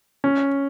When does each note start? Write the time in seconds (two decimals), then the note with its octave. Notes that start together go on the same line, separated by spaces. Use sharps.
0.24 C#4